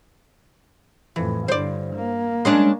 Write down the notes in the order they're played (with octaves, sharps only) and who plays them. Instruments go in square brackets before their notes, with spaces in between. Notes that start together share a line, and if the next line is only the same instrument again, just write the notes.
[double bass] F2 A2 [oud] E3
[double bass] G2 D3 [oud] C5 D5
[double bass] A#3
[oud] G#3 C#4 D4